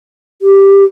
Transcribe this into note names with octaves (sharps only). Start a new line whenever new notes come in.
G4